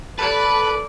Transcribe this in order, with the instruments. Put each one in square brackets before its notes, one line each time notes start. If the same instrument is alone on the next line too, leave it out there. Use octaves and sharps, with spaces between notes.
[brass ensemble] A4 [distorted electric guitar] B4 [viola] D5 [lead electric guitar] A5